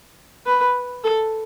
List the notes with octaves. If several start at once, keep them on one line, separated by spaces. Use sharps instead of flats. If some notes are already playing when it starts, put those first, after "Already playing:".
B4
A4